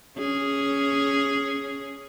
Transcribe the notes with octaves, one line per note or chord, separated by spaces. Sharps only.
C#4 G#4